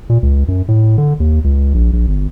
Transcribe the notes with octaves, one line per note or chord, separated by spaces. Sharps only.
A#2
C#2
F#2
A2
D3
D#2
C#2
A#1
A#1
G1